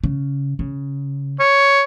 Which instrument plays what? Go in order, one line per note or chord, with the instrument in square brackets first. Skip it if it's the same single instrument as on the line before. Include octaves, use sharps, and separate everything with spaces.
[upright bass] C#3
C#3
[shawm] C#5